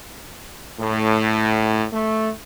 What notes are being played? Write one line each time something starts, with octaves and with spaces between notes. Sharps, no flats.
A2
A3